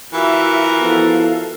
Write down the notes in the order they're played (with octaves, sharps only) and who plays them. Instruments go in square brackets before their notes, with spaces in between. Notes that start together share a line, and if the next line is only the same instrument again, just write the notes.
[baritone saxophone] E3 [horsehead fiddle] F4 E5 [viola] F#4 A#4
[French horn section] F3 B3 E4 [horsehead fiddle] A4 F5